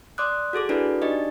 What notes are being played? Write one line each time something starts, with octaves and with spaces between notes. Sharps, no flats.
D5 C6 D6 D#6 F#6
F#4 G#4 A4 D6
D4 E4 F#4 A4 B4 D5
D4 D#4 G4 D5 D#5